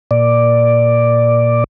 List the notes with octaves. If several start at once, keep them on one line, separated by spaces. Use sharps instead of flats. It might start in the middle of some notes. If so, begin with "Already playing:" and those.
A#2 D5